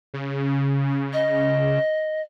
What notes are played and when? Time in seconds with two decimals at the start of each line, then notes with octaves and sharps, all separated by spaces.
0.14 C#3
1.13 D#5